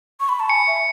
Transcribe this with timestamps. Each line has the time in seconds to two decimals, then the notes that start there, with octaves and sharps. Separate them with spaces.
0.20 C#6
0.29 B5
0.40 A5
0.49 G#5 C#7
0.67 E5